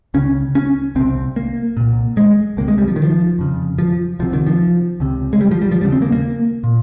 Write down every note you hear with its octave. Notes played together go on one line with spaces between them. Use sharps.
C#2 C#3 C#4
C#4
C2 C3 C4
A#3
C2 A#2
G#3
C#2 C3 A#3
G#3
G3
F3
D#3
F3
F2 C#3
F3
C2 C3 F3
D#3
F3
C#2 C3
G#3
G3
F3
G3
F3
D#2 C#3 G3
C4
A#3
A#3
A#2